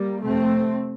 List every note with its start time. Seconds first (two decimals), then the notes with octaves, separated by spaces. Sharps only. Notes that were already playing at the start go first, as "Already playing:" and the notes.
Already playing: G3 A#3
0.23 F2 C3 A3 C4